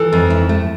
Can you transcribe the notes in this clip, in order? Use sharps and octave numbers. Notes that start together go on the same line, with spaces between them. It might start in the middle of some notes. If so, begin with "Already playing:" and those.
Already playing: E3 A4
F2
E4
A3